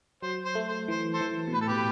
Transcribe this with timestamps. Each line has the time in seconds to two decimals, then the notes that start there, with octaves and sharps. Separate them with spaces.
0.22 F#3 C5
0.45 C5
0.55 A3
0.68 C5
0.88 E3 C5
1.13 A4 C5
1.21 E3
1.48 B2
1.53 A2 B4
1.61 A4
1.68 B2 G4 B4